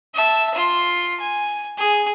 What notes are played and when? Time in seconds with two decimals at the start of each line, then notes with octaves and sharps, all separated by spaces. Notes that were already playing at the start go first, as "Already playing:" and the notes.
0.14 E5 A5
0.55 F4 C6
1.20 G#5
1.78 G#4